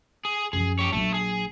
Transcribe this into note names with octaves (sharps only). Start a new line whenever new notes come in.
G#4
F#2 F3 G#4
G4 C#5
A#1 F#3 A3
G#4